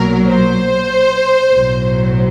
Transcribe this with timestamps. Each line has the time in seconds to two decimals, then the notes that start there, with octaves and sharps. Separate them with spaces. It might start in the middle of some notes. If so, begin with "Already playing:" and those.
Already playing: B1 A#2 F#3 A#4
0.29 C5
1.51 B1 A2 F#3